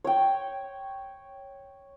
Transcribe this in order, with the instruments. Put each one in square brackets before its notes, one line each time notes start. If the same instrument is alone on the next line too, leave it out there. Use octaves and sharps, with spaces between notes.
[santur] C#5 G5